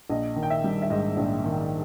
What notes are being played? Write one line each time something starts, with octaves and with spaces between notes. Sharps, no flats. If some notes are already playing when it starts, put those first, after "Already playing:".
A#1 D#5
D#3
G5
E5
G3
E5
G#2 D#5
A#1
D#3